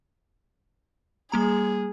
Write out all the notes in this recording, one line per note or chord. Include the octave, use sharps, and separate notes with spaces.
G3 A#3 G#4 A#5